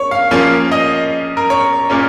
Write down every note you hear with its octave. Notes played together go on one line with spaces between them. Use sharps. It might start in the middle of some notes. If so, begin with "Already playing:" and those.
Already playing: C#5
F5
A#2 F3 A#3 C#4 F5
D#5
A#4
C#5
A#2 A#3 C#4